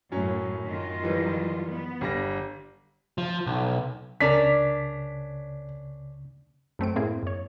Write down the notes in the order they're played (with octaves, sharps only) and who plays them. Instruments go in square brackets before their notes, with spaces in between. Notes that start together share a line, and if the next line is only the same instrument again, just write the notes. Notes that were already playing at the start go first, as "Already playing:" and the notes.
[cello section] F#2 A2 [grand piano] F#3 C#4
[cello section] F#2 D#3 F4
[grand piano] E3 F3 G3
[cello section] B3
[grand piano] G1 G3 A#6
[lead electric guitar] F3
B1
[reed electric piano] C#2 C#3 [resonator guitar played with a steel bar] C#4 D4 A#4 [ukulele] D5 [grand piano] B6
[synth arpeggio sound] F#2 A3 C4 D7
A2 A#3 C4 E4 G#4
F#2 C#5